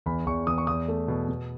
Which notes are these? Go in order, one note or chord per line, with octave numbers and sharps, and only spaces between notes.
E2 B5
E2 C#6
E2 D#6
C#6
E2 D#6
A3
B2
B2